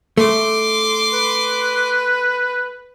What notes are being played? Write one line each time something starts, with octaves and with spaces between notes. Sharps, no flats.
A3 C6 D6
B4